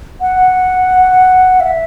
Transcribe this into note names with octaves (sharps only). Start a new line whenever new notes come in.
F#5
E5